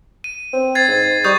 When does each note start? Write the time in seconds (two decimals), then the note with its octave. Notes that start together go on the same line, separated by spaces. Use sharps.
0.24 D#7
0.53 C4
0.75 G#6 A6 C7
0.88 G#2
1.24 G3 C#6 D#6 G6